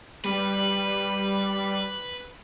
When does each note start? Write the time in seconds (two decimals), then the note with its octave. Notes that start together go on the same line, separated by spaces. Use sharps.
0.24 G3 B4